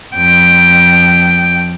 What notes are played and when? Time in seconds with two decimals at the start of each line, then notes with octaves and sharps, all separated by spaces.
0.16 F2 G5